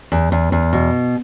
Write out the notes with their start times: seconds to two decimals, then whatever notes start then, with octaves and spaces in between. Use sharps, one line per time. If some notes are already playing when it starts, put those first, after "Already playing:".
0.12 E2
0.32 E2
0.52 E2
0.73 B2